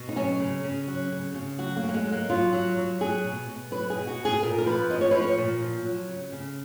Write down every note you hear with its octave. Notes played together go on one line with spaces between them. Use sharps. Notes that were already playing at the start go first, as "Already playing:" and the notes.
Already playing: B2
D#4
F#3 C#4
C#3
C#3
F#3
C#3
C#3
F#3 F#4
A#3
F#3
A#3
G#3
F#3
A#3
F#3 F4
F#3
F#3
F#3 G#4
B2
B2
F#3 B4
G#4
B2
F#4
B2
G#4
A#2 A#4
A#4
F3 B4
F3 D#5
C#5
F3 B4
C#5
A#2
F3
F#3
C#3
C#3